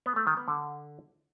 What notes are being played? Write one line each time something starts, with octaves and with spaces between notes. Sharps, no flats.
B3
A3
D#3
B3
D3